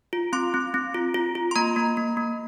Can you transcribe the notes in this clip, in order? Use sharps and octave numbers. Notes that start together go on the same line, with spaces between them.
F4
C4 C6
C4
C4
F4
F4
F4
C6
A#3 A#5
A#3
A#3
A#3